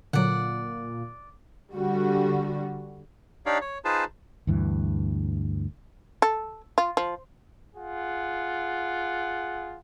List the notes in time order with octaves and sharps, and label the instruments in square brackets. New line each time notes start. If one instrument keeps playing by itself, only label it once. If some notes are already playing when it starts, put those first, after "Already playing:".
[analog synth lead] A#2 [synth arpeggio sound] D3 F#3 [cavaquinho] D5 F#5
[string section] D3 G3 F#4
[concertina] D4 D#4 G4 C#5 D5 F5
C#5
D#4 F4 G#4 B4 C5 A5
[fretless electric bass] D2 G2 E3
[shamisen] A4
F4
F3
[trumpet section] F4 G#4 F#5